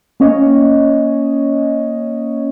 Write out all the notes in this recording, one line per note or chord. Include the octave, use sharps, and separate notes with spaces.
A#3 C#4 C#5 D#5